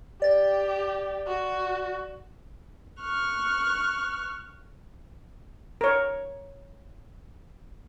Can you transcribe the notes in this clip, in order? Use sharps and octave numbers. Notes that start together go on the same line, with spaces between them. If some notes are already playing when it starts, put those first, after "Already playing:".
G4 D5 A6
F#4
C#6 F6 F#6
A#4 C#5